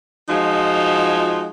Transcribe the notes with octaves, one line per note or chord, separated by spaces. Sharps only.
F3 G#3 D#4 F4 F#4